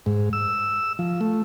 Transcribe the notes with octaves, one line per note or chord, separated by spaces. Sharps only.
G#2
E6
F3
A3